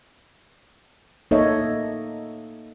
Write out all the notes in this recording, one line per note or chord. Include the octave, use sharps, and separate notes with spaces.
A#3 D#4 A4 C#5 D#5 E5